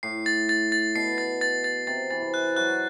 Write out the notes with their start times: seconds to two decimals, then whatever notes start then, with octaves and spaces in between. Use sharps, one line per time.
0.03 A2 C7
0.26 A6
0.49 A6
0.72 A6
0.95 B2 C7
1.18 A6
1.41 A6
1.64 A6
1.87 C3 A6
2.10 E3 A6
2.22 C3
2.34 F#6
2.56 F#3 F#6